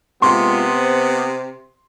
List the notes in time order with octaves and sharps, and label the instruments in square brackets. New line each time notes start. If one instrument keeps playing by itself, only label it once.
[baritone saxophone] C3 [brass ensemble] G#3 A#3 F4 [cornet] B3 [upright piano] C6
[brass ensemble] C5